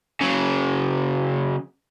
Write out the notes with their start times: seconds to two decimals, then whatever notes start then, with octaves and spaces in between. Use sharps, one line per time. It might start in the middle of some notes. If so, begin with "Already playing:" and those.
0.21 C#3 F#3